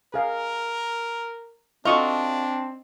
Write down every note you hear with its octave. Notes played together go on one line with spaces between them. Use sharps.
G#4 A#4 F5
C4 D4 F4 F#4 A4 D#5 C#6